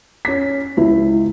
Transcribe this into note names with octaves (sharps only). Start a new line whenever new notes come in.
C#4 B6
C#2 E4